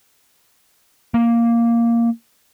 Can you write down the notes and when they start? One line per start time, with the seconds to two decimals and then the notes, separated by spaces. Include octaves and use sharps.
1.14 A#3